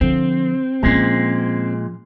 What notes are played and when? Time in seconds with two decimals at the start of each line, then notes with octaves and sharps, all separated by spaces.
0.01 D3 F3 C4
0.83 A#2 F3 G#3 C#4